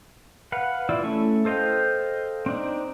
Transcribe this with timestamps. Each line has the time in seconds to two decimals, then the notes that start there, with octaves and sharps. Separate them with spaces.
0.52 B4 F5 F#5
0.89 E3 E4 F4 D5 E6
1.03 A3 C#4 E4 C#6
1.45 A4 C5 D#5 F5 G5
2.46 C4 D4 D#4